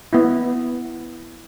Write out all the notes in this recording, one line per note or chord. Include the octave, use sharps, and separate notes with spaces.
B3 E4